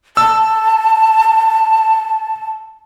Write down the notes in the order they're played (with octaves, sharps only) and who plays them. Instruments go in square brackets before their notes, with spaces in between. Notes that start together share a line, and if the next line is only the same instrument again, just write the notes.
[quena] A5 [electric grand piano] E6